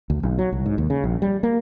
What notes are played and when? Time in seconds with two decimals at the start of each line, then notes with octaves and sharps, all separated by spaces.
0.10 D2
0.23 B1
0.39 F#3
0.52 C2
0.66 G#2
0.78 D#2
0.90 C#3
1.04 A#1
1.22 G3
1.43 A#3